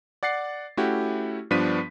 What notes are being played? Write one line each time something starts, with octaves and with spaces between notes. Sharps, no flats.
D5 F#5 A6 C7
A3 C#4 E4 F#4 G4
G2 F3 B3 D4 B6 D#7